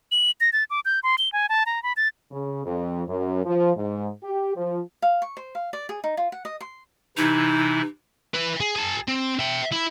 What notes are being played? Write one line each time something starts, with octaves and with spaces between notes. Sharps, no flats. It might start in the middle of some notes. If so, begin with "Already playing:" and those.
F#7
A#6
A6
D6
G6
C6
G7
G#5
A5
A#5
B5
A6
C#3
F2
F#2
F3
G#2
G4
F3
F5
C#6
C5
F5
D5
G#4
D#4
F4
F#5
D#5
C6
C3 E3 D#4 E4
E4 B4
G#4
G#4 A5
C4
E5 G5
E4